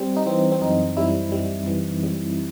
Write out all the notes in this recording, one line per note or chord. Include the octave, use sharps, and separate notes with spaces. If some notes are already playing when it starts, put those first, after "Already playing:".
Already playing: G3 C4
D#4
E3 C4
C4
F#2 D#4
G3 E4
G3
E3
G3